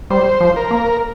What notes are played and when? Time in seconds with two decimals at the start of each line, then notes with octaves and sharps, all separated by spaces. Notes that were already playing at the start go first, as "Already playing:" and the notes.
0.10 G3 C5
0.40 F3
0.56 A#4
0.71 A#3